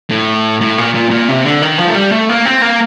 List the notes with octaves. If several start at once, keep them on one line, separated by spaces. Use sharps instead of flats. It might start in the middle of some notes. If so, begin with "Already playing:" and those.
A2
A2
A#2
A#2
A#2
C3
D3
D#3
F3
A3
G3
A3
A#3
C4
A#3